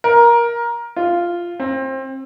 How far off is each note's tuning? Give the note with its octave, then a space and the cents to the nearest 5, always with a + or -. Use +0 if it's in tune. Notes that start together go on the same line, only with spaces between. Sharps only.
A#4 +15
F4 -5
C4 +25